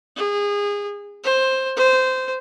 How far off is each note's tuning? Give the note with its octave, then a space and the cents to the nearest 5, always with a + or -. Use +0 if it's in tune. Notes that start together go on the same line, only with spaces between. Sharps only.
G#4 -25
C5 +10
C5 -15